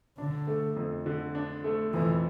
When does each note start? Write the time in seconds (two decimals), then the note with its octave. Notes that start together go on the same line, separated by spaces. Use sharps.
0.18 D3 D4
0.47 A3
0.76 F2
1.06 D3
1.35 D4
1.64 A3
1.93 F2 E3